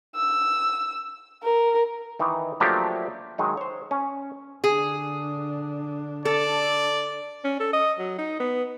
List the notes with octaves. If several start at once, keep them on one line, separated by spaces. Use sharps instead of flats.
E6
A#4
D#3 E3 D#4
F3 F#3 A3 A#3 D4 G4
D#3 F#3 G#3 D#4
C5 C#5
C#4
D3 D4 G#4
A4 D5
C#4
A4
D#5
F#3
D#4
B3